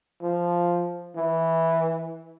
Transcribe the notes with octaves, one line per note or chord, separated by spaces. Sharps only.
F3
E3